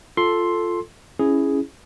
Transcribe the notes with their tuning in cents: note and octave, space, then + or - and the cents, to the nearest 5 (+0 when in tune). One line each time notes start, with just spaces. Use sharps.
F4 +0 A4 +0 C6 +5
C#4 +0 E4 +0 G#4 +0